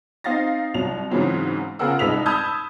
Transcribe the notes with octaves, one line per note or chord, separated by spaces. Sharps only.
C4 D#4 F5 A6 A#6
C2 F#3 F7
G#2 C#3 E3 F#3 C4
C#3 F4 G#4 A#4 F#5 E6
C2 G#3 D#4 B4 B6 F7
A5 B5 D#6 E6 G6 G#6